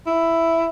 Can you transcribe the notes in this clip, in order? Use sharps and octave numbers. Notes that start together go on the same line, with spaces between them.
E4